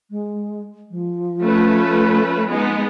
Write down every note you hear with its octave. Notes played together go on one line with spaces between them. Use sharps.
G#3
F3
A3 C#4 B4
G#3 B3 D#4